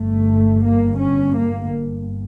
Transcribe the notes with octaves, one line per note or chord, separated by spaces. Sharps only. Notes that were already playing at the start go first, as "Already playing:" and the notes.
Already playing: G1 G2 A3
A#3
C#4
A#3